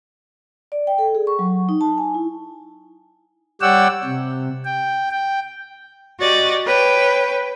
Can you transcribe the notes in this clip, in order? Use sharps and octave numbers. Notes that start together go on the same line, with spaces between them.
D5
G5
A4
G#4
C#6
F#3
D#4
A5
G#5
E4
G3 C#5 D5 F#5 G5 E6
C3
G5
G5
F#4 G4 D5 D#5
B4 C#5 G5